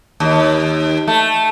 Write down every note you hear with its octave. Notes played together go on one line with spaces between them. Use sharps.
D#2
A3